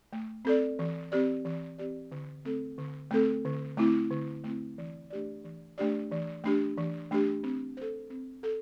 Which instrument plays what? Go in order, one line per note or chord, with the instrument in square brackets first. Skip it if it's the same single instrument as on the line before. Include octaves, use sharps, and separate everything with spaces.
[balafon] A3
C4 A4 D5
E3
C4 G4 D5
E3
C4 G4 D5
D3
A3 C4 A4
D3
A3 C4 A4
D3
A3 C4 E4
D3
A3 C4 E4
E3
A3 D4 G4 D5
E3
A3 D4 G4 D5
E3
A3 D4 G4
E3
A3 D4 G4
C4
A4 C5
C4
A4